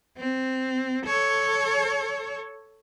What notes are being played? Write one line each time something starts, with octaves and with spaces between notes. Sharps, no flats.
C4
A4 C#5